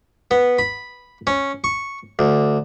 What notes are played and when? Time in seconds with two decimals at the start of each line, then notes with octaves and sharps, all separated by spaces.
0.31 B3
0.58 B5
1.27 C#4
1.64 C#6
2.19 D2